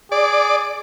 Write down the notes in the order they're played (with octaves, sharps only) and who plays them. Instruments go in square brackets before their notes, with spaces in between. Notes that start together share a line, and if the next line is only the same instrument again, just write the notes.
[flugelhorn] G#4 [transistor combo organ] D5